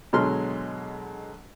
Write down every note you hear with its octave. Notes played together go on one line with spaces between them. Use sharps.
B2 D3 F#3 G#3 C6 F6